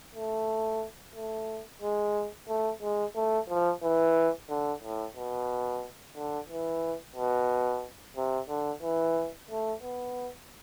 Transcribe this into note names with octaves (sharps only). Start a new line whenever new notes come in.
A3
A3
G#3
A3
G#3
A3
F3
E3
D3
A2
B2
D3
E3
B2
C3
D3
E3
A3
B3